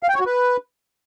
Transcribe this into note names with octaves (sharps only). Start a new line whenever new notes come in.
F5
G5
C#5
F#4
B4